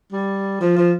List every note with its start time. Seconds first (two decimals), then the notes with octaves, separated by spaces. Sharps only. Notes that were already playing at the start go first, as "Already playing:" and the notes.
0.12 G3
0.61 F3
0.77 F3